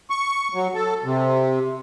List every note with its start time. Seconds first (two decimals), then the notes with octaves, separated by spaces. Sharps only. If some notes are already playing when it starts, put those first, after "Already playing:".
0.10 C#6
0.54 F#3
0.74 A4
1.04 C3